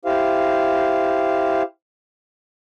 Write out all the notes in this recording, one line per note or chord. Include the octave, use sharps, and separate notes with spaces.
E4 G4 C5 F5